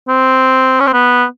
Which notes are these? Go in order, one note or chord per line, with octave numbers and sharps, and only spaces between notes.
C4
C#4
C4
B3